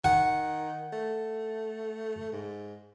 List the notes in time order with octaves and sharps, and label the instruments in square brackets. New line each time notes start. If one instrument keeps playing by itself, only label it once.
[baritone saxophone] D#3 [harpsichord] F#5
[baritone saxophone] A3
G#2